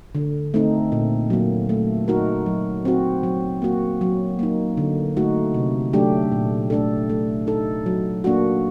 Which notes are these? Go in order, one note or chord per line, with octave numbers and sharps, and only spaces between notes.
D3
A3 C4 D#4
A#2
F#3 A#3
A3
D#4 F#4 A#4
F#3
C4 F#4
F#3
A#3 F#4
F#3
A#3 D#4
D3
A3 D#4 F#4
C3
F#3 A3 D4 G4
A#2
A3 D4 A4
A3
D#4 A4
F#3
A#3 D4 F#4